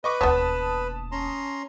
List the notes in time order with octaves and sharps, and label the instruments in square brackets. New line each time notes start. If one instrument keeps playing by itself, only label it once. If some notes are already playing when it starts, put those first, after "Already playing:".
[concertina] B4 [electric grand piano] D#5 C#6 D6
[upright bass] E1 D#2 [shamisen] B3 C#5 [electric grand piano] A5 D#6 B6
[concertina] C#4 A#5 C6